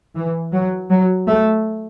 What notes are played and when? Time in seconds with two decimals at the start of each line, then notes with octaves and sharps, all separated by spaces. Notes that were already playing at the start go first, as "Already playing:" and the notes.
0.16 E3
0.52 F#3
0.90 F#3
1.27 A3